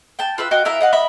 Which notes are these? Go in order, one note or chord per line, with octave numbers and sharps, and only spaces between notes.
G5 A5
F4 B4 E5
F#4 D#5 F5 G5
E4 A#4 E5 F5
D#5 F5 F#5
D#5 E5 B5